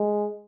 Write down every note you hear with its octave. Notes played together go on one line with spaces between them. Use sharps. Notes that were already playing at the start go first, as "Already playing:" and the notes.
Already playing: G#3